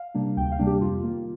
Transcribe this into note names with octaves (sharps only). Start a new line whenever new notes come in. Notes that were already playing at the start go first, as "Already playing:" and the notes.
Already playing: F5
C3 G3 A#3 D4
D2 G5
F5
C3 G3 A#3 D4
G4
F2 F4
D#3 A#3